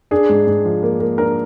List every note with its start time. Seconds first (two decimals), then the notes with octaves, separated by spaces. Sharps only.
0.11 D4 G#4
0.29 G#2
0.47 G#2
0.65 F3
0.83 A#3
1.00 A#3
1.18 D4 A#4